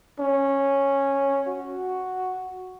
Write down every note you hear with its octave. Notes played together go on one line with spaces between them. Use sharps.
C#4
F#4